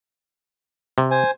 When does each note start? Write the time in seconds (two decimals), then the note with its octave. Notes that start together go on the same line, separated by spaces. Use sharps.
0.98 C3
1.11 C5 G#5